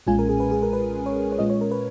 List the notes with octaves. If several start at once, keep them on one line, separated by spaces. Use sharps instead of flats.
B1 A#2 G#3 C#4 F4 G#5
A#4
G#4
B4
G#4
A#4
B4
C#5
C#5
A#2 G#3 C#4 F4 D#5
C#5
A#4
B4